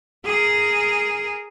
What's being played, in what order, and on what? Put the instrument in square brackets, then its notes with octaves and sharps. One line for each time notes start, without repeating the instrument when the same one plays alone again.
[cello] G#4 A#4